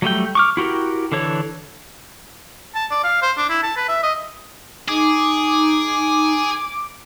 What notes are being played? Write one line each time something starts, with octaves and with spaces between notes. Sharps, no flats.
F#3 G3 A3 G5
C#6 D6 F6
E4 F#4 G4 A#4
D3 E3 A4 C#5
A5
D5
F5
C5
D4
E4
A5
B4
E5
D#5
D#4 G#4 D6